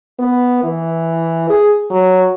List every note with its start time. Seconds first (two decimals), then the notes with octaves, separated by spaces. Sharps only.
0.19 B3
0.64 E3
1.50 G#4
1.91 F#3